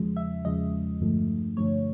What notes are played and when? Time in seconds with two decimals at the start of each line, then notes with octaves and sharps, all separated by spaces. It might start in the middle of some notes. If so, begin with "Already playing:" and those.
Already playing: E2 C#3 F3 G#3
0.17 E5
0.45 E2 C#3 F3 G#3 D#5
1.01 G2 D3 F3 A3
1.57 G2 D3 F3 A3 C#5